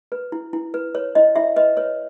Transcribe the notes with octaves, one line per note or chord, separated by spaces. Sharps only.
B4
E4
E4
B4
B4 C#5
E4 D#5
E4 E5
B4 D#5
B4 C#5